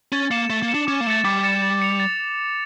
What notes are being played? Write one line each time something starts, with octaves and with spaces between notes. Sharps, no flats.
C#4 A6
A#3 C#7 E7
A3 A6
A#3
C#7 E7
D4
C#4 D6
A#3
A3 A6 C#7 E7
G3 D6
A6 C#7 E7
A6
C#7 F7
A6